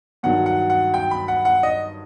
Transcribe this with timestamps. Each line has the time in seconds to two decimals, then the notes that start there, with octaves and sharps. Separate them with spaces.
0.23 G2 D#3 F#3 F#5
0.46 F#5
0.70 F#5
0.94 G5
1.11 B5
1.28 F#5
1.45 F#5
1.63 D#5